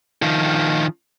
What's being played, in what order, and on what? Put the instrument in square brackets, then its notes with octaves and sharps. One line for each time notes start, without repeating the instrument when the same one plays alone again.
[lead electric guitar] D#3 F3